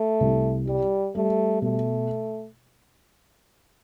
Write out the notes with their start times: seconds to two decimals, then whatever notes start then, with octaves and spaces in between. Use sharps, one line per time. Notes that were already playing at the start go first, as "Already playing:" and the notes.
Already playing: A3
0.20 C2
0.67 G3 G4
1.15 G3 A3
1.62 B2 A3